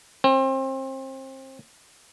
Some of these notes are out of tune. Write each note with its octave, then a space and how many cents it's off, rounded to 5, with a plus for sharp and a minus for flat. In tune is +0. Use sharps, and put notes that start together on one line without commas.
C4 +30